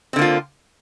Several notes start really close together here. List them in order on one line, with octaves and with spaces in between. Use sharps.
C4 D3 A#3 F4